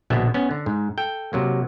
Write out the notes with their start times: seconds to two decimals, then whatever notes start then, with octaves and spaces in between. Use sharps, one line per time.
0.10 A#1 B2 D3 B3 E5
0.34 B3 C#4
0.51 D3
0.66 G#2
0.98 A4 G5
1.33 C3 F#3 A#3